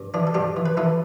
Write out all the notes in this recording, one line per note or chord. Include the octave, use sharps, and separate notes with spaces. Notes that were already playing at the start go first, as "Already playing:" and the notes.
Already playing: G2
E3 D4
A4
G2 D4 G4
E3
B4
E3 E4 A4